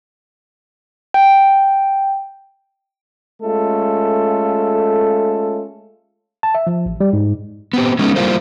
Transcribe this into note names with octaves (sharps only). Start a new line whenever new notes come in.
G5
G#3 A3 C#4 F4 A4
A5
E5
F3
A1
G3
G#2
B3 C4 G4
G#3 A3 B3 C#4 D#4
G3 A#3 E4 F4 A#4 C5